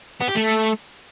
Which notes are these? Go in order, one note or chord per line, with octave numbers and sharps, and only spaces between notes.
B3
G4
A3